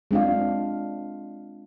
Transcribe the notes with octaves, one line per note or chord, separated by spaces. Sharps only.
G#3 C4 D4 F4 F5